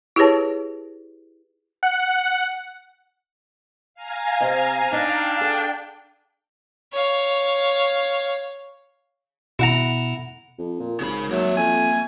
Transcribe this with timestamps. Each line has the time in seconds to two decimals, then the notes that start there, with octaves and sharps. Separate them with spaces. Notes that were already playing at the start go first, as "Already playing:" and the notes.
0.16 E4 G4 G#4 B4 C#5 A5
1.83 F#5
3.94 F5 G#5 A#5
4.41 C3 C4 D#5
4.93 D4 D#4 F5 G5
5.41 G#4 A4 F#5 G5
6.92 C#5 F5
9.59 B2 E4 F#5 A#5
10.58 F2
10.80 A#2
11.00 G#1 C#3 B5
11.31 F#3 A#3 E5
11.57 F2 G#5